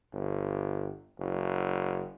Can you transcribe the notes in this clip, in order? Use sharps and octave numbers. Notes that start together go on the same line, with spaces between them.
G1
F#1